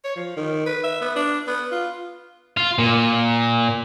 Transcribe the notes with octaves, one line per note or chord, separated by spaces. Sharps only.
C#5
F3
D#3
B4
E5
B3
D4
B3
F4
F4
A#2